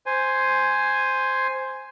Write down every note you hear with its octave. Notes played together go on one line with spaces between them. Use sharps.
C5 G#5